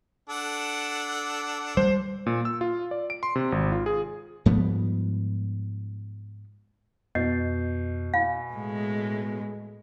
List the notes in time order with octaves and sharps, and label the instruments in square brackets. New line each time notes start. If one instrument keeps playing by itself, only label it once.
[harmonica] D4 A4 F#5
[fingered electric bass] G3 [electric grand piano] C5
[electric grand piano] A#2
E6
F4
D5
D7
C6
C3
G#1
F4
G#4
[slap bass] G#2 F3 G3 B3
[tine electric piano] F2 G6 C7 [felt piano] B2 [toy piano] D#5
[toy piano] F5 [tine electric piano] G#5 B5
[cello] A2 G#3